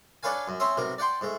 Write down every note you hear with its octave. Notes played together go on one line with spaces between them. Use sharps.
D4 A4 B4 C#5 F5 G#5
F#2
C4 C#4 E5 C6 D#6
B1 C3 A#4
D5 F#5 G5 C6
G#2 A3